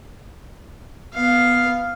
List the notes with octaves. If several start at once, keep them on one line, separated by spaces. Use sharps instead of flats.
B3 F5